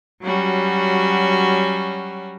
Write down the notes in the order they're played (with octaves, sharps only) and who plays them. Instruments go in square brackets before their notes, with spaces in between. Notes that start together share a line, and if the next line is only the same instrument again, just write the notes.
[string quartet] F#3 G3 C#4 F#4